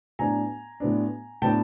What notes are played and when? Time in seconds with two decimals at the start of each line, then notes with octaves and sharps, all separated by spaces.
0.19 A2 F#3 B3 D4 G#5 A#5
0.80 A2 F#3 B3 D4
1.42 A2 F#3 B3 D4 G5 A5